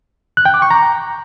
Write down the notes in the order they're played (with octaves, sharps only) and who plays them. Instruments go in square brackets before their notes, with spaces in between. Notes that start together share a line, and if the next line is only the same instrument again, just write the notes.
[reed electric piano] F#6
G5
D6
C#6
A#5